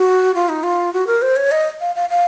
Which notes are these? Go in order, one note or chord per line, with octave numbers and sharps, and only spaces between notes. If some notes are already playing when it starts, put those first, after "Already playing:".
Already playing: F#4
F4
D#4
F4
F#4
A#4
C5
C#5
D#5
F5
F5
F5